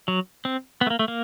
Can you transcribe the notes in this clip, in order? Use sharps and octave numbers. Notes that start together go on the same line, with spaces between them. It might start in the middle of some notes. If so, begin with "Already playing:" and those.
F#3
C4
B3
A3
A#3
A3
A#3